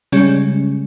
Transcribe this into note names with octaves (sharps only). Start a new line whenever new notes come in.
C#3 G3 G#3 C#4